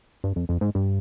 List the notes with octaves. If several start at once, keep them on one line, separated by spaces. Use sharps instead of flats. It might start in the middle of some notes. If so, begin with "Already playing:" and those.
G2
F2
F2
G#2
G2